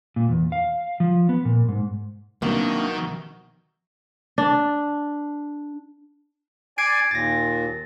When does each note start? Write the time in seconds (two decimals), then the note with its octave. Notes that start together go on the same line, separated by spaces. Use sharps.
0.16 A#2
0.29 E2
0.52 F5
1.00 F3
1.29 B3
1.45 A#2
1.69 G#2
2.42 C2 B2 D#3 F#3 A#3 D4
4.38 D4
6.78 D5 G#5 G#6 C7 D7
7.11 D#2 A#2 A6 A#6